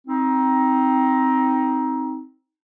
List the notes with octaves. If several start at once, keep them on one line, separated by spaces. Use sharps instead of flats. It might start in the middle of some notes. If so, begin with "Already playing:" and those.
C4 D#4